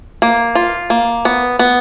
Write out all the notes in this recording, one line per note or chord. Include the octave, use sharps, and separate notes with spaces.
A#3
F4
A#3
B3
B3